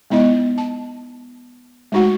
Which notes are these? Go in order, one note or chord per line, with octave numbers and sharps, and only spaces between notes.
G#3 B3 D#4 E4 D#5
A5
G#3 A3 D#4 F#4 F#5